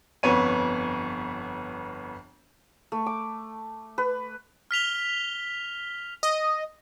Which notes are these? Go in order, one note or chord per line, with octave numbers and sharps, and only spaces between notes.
G1 F2 B3 C#5 D#7
A3
D6
B4
F6 B6 F7 G7
D#5